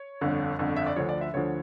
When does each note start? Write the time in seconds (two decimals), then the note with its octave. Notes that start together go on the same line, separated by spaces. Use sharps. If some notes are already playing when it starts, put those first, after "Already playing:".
Already playing: C#5
0.21 G1 F2 D3
0.59 G1 F2 D3
0.76 E5
0.87 D5
0.96 D2 D3 F3 C#5
1.09 D5
1.21 E5
1.34 D2 D3 F3 C#5